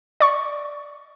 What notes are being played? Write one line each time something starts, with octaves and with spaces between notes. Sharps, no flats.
D5 C#6